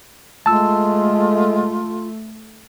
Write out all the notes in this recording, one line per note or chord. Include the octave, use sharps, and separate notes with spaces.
G#3 A3 F4 A5 E6